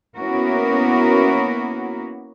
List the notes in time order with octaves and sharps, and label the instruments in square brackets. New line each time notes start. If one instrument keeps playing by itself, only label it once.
[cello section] A#3 B3 C#4 E4 F#4 A#4